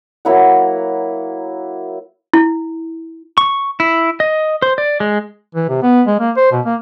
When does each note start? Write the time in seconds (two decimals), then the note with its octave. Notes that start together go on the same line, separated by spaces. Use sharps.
0.25 F#3 A#3 E4 F#5
2.34 E4
3.38 C#6
3.80 E4
4.20 D#5
4.62 C5
4.78 D5
5.00 G#3
5.55 E3
5.69 C3
5.83 B3
6.07 G#3
6.20 A#3
6.37 C5
6.52 B2
6.65 A#3